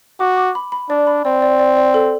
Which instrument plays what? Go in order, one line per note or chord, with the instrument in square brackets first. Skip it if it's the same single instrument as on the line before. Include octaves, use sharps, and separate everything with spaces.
[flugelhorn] F#4 [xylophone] D6
[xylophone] D6
B5
B5
[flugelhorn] D4 [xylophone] D5
[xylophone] B5
[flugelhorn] C4 [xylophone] D5
[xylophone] D5
D5
D5
A4